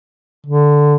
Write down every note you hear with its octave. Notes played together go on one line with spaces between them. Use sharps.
D3